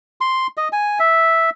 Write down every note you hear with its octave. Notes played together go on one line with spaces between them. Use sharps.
C6
D#5
G#5
E5